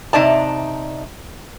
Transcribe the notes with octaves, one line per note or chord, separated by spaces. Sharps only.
C3 D#4 D5 A5